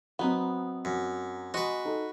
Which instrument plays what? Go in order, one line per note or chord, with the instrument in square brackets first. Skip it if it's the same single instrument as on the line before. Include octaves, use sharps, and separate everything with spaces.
[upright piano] F#3 C4 [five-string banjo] B3 D#4 B4
[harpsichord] F#2
[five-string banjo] G#3 D#5 [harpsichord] F#4 B4
[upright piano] D#4 A4